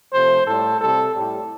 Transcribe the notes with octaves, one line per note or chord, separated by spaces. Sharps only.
C3 F3 A3 C5
A2 G3 A4
C3 G3 A4
A2 G3